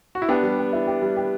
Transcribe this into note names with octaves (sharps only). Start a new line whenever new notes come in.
F#4
E4
B3 D4 G4
G3
G4
E4
G4
G3
G4